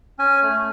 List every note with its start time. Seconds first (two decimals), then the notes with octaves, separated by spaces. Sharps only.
0.19 C#4 G#5
0.43 A3